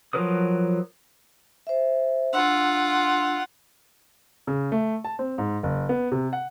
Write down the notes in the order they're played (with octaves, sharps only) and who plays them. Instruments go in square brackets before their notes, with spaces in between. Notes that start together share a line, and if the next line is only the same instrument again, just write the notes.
[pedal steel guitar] F3 F#3 A#4 B4 D#6
[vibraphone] C5 E5
[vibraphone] D4 C6 E6 [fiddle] F4 F#5
[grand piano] C#3
A3
A5
C4
G#2
F#1
B3
C3
F#5